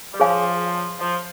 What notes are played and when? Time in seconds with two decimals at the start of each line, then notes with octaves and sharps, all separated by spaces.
0.14 G3
0.20 F3 G#4 C#5 F5 G#5
0.99 F3